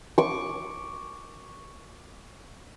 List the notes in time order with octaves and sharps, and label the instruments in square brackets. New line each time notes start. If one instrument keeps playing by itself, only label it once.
[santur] C#6 D6